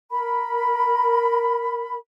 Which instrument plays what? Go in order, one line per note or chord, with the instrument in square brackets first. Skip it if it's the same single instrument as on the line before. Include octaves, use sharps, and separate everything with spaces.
[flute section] A#4 B5